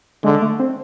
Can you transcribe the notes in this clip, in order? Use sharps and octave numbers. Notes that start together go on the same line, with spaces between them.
D3 G#3
A3
C4